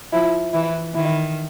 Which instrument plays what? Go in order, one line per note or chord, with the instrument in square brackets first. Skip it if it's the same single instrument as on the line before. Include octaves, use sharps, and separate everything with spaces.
[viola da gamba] F3 [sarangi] E4
[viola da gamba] E3 [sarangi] E4
[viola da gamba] D#3 [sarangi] E4